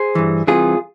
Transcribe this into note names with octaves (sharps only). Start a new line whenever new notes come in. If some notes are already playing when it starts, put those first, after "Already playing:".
Already playing: G#4 C5
G2 E3
C2 C3 E3 F4 G#4